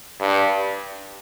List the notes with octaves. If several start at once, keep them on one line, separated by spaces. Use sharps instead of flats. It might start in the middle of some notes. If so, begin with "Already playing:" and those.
G2